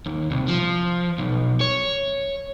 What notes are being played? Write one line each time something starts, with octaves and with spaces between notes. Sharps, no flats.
D#2
C2
F3
B1
C#5